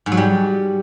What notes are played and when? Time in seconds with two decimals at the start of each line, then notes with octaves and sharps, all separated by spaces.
0.06 G#2
0.12 F#3
0.17 G3